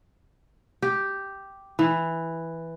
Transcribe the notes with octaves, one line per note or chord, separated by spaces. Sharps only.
G4
E3